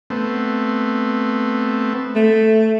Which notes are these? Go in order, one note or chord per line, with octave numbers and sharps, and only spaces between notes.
A3 B3 C4
A3